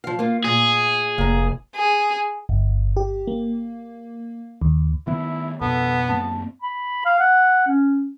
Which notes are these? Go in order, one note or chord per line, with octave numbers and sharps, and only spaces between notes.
F3 F5
A#3 F4
A#2 G#4
F1 A#3 A#5
G#4
G1
G4
A#3
D#2
D#3 B3 E4
F2 B2 B3 A4
F#2 A#3 C4 A5
B5
F5
F#5
C#4